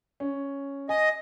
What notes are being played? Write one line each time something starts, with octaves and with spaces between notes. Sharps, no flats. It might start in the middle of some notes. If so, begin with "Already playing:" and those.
C#4
D#5 G#5